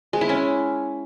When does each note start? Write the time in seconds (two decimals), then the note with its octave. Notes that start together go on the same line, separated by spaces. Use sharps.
0.13 G#3
0.21 E4
0.29 C#4